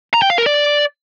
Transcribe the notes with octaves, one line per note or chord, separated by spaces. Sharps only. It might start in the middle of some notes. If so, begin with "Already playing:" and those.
A#5
G5
F5
A#4
D5